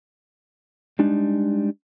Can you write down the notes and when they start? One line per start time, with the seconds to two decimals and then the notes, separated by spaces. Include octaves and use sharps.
0.99 G3 G#3 D4 D#4